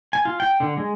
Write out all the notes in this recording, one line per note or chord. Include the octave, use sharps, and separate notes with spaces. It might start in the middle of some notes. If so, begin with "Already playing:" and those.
G#5
F4
G5
D3
G#3